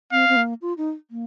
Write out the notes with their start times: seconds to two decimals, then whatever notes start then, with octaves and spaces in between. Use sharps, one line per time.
0.12 C4 F5
0.29 C4
0.36 A#3
0.62 F4
0.78 D#4
1.11 A#3